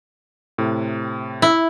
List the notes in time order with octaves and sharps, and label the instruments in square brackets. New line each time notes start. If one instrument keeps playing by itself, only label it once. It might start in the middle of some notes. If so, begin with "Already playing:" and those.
[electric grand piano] A2 C3
[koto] E4